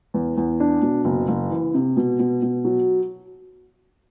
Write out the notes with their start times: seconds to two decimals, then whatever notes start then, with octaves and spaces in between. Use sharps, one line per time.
0.14 E2
0.37 E2
0.60 D4
0.82 B2
1.05 F#1
1.28 F#1
1.50 E3
1.74 C3
1.97 B2
2.20 B2
2.42 B2
2.65 F#3